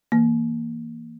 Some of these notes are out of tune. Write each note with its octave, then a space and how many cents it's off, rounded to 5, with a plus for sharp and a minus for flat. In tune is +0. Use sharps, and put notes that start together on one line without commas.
E3 -5 A#3 +0